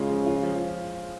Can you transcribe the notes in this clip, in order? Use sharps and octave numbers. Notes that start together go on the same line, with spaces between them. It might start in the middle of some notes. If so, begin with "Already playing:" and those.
Already playing: C#3 G#3 F4
F3
F4
F3